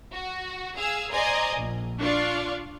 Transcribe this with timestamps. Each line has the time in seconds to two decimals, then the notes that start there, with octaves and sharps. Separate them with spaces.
0.14 F#4
0.76 G#4 F5 E6
1.11 C5 D5 D#5 G#5 A#5 C6
1.56 A#1
2.01 D4 F4 D5 F5 C#6